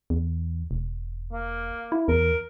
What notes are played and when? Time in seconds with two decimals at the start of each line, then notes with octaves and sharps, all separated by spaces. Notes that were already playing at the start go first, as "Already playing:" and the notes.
0.10 E2
0.71 E1
1.33 A#3
1.92 E4
2.08 E2 A#4